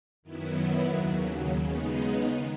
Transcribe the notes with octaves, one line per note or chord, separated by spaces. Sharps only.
F#2 D#3 F#3 B3 E4
D#2 C#3 F#3
C#3 G#3 B3 D#4
D#3